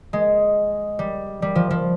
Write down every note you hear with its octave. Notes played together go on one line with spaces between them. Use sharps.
G#3
G3
G3
F3
F3